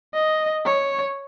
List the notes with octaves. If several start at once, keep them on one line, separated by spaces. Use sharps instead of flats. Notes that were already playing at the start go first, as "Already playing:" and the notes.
D#5
C#5